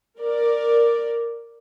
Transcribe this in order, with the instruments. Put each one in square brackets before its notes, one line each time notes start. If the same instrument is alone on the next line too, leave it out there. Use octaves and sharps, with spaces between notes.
[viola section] A#4 D5